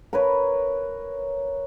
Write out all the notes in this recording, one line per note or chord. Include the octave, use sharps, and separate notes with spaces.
A#4 B4 C#5